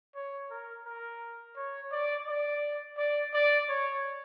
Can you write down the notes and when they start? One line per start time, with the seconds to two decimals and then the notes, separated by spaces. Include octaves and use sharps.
0.15 C#5
0.50 A#4
0.86 A#4
1.56 C#5
1.91 D5
2.27 D5
2.97 D5
3.33 D5
3.68 C#5